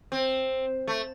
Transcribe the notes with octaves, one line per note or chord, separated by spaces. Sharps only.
C4
A3